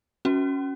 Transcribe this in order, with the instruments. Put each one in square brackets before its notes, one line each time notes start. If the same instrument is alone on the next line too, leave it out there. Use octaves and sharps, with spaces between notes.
[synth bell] C#4 F#4